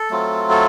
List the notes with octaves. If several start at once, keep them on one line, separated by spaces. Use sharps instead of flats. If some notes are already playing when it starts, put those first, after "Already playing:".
Already playing: A4
F#3 A3 C4 F4
A4